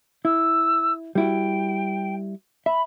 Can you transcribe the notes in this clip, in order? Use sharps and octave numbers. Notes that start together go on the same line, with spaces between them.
E4 E6
G3 E4 F#4 G5
E5 B5